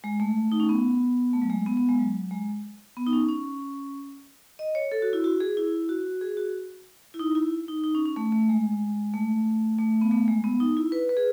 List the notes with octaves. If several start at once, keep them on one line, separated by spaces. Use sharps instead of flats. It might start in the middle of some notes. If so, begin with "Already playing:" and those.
G#3
A3
D#4
C#4
B3
A3
F#3
G#3
B3
B3
G#3
F#3
G#3
B3
D#4
C#4
C#4
D#5
C#5
A4
F#4
E4
F#4
G#4
E4
F#4
G#4
F#4
E4
D#4
E4
D#4
D#4
C#4
C#4
A3
A3
G#3
A3
A3
B3
A3
G#3
B3
D#4
E4
B4
B4
G#4